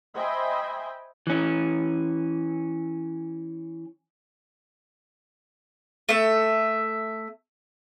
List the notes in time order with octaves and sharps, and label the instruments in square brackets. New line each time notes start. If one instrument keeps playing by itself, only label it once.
[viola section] C5 D#5 E5 G5 G#5 B5
[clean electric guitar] E3 C#4
[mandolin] A3 E5